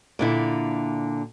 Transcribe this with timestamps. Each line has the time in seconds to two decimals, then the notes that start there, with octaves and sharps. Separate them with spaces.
0.19 A#2 D3 E4